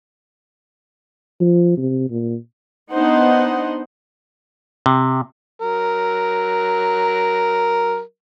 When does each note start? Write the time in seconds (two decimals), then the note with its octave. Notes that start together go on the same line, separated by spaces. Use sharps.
1.41 F3
1.77 C3
2.10 A#2
2.90 B3 D4 D#4 C5 D#5 F#5
4.86 C3
5.61 F#3 A#4